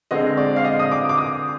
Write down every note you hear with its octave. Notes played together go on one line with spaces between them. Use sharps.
D3 G#3 C4 D#5
D5
F5
D#5
D#6
D6
D6
D#6